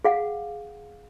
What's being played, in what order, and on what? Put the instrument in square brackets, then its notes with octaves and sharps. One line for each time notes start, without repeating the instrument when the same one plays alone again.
[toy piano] G#4 F5 F#5